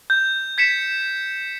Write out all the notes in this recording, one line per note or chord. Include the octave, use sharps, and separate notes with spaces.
G6
G#6 B6 C#7 E7